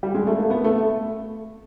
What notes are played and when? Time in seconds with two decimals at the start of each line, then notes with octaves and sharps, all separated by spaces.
0.03 G3
0.15 G#3
0.27 A3
0.38 A#3
0.50 B3
0.64 A3